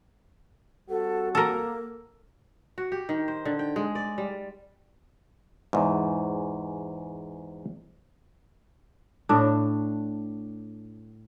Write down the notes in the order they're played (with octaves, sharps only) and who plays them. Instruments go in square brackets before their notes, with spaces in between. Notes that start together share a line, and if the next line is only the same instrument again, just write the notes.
[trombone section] G3 C4 F#4 [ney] A4
[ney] A#3 [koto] A4 A#4
[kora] F#4
G4
D#3
C5
D3
G5
G#3
D5
G3
[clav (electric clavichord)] E2 G#2
[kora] A2 D4